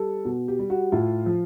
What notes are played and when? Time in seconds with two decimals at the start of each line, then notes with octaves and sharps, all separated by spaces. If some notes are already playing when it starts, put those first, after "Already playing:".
Already playing: G3 A4
0.25 B2
0.48 G4
0.59 G3
0.70 F#4
0.92 A2 F4
1.26 F3